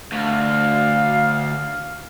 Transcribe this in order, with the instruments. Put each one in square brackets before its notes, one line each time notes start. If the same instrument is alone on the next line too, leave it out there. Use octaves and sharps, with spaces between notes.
[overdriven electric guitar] D2 [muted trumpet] F5